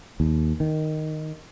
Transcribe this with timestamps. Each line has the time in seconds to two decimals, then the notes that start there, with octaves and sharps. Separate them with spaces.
0.20 D#2
0.60 D#3